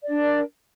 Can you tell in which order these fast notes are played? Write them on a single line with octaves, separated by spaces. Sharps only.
D5 D4 A#4